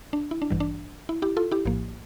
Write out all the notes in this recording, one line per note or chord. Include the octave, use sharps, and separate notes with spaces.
D4
E4
D4
A1 G2 E3 G3
D4
E4
E4 G4
F4 A4
E4 G4
A#1 A2 F3 A#3